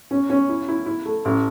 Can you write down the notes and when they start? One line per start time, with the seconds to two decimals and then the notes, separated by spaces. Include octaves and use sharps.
0.11 C#4
0.30 C#4
0.49 E4
0.68 E4
0.86 E4
1.05 A3
1.25 A1